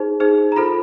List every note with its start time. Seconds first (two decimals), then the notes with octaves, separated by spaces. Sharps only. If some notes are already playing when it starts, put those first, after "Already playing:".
Already playing: D#4 G#4 C5
0.20 D#4 G#4 C5
0.52 A#5
0.56 F4 A4 C5 B5